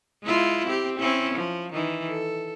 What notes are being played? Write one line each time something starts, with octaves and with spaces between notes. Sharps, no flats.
G#3 E4 F4
C4 G4
C4 C#4 E4
F3
D#3 E3
A4